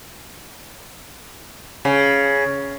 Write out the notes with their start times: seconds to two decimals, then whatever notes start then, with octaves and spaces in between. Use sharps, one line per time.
1.85 C#3